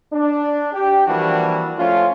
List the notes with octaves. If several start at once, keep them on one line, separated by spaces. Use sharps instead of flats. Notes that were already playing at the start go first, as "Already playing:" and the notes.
D4
G4
E3 F3 G3 A#3 D4 F#4
F3 A3 C#4 F4